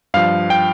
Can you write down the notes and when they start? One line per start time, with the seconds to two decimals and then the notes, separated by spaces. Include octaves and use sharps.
0.14 G2 F3 F5
0.50 G5